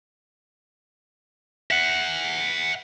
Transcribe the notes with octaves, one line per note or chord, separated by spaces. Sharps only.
E5 F#5